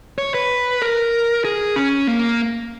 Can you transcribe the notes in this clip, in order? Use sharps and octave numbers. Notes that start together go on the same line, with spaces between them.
C#5
B4
A#4
G#4
C#4
A#3